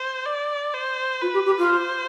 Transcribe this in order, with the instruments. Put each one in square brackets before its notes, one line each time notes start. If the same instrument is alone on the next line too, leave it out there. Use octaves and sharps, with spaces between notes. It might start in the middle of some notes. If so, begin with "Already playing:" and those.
Already playing: [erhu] C5
D5
C5
[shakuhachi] F4 [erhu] B4
[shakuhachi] G4
G4
F4
[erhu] C5